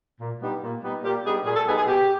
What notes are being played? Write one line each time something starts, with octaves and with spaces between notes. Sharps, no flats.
A#2
G3 B3 D#4
A#2
G3 B3 D#4
A#2 G4
G3 B3 D#4 G#4
A#2 G#4
A4
G3 B3 D#4 G#4
G#4
B2 G4